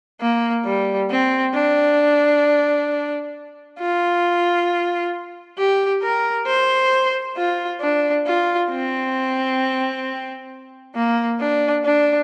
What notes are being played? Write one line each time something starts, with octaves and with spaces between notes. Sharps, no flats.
A#3
G3
C4
D4
F4
G4
A#4
C5
F4
D4
F4
C4
A#3
D4
D4